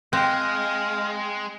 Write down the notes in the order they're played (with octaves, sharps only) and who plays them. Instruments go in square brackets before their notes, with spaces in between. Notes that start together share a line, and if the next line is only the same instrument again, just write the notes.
[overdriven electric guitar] G#3 [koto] C4 [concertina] D#5 F5 [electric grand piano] G5 F#6